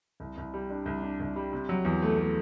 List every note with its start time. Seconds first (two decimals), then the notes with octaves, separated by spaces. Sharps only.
0.20 C2
0.38 C2
0.54 G3
0.70 D4
0.86 C2
1.02 D4
1.20 C2
1.36 G3
1.53 C3
1.69 F#3
1.85 E2
2.02 A3
2.18 A3